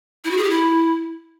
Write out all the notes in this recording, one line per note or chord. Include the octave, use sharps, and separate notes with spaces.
E4
F#4
G#4
G4
E4